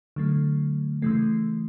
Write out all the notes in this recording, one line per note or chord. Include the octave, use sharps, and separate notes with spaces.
D3 F#3 A3
C#3 E3 A3